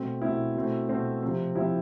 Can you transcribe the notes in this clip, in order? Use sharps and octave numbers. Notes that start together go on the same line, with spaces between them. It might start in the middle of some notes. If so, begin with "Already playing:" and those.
Already playing: B2 A3 C4
B2 A3 C4 E4
B2 A3 C4
B2 A3 C4
C3 F3 C4
C3 F3 C4 E4